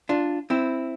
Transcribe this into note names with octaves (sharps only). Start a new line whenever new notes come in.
D4 F4
C4 E4